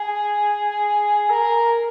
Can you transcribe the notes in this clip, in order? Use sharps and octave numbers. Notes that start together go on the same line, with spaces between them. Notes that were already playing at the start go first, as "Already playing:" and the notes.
Already playing: G#4
A#4